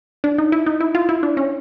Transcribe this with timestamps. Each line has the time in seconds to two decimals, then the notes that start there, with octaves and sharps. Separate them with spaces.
0.24 D4
0.38 D#4
0.52 E4
0.67 D#4
0.80 E4
0.95 F4
1.09 E4
1.23 D4
1.37 C#4